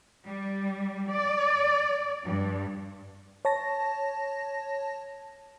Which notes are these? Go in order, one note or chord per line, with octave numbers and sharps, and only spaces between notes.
G3
D5
G2
C#5 A5 A#6